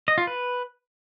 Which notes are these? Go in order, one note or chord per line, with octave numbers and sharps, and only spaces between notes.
D#5
F4
B4